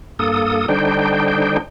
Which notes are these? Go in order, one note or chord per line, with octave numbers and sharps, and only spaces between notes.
G2 A#3 A4 D#6
D3 G3 D4 D#4 C5 G5